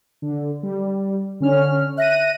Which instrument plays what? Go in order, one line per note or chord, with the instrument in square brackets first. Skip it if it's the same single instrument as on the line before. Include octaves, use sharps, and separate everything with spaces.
[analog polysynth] D3
G3
D3 C#4 F6
[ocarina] E5 [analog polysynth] F#6 A#6 D#7